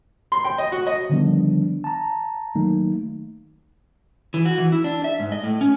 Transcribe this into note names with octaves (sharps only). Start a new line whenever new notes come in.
C6
G5
D#5
F#4
D#5
D3 D#3 F3 G3 B3 D4
A5 A#5
D#3 F#3 A3 A#3 D#4
E3
F#4
E3
E4
D4
E5
G#2
D#5
A2
C#4